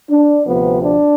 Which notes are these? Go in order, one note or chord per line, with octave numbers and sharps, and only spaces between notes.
D4
D2 C3 F3 A3 B3
D4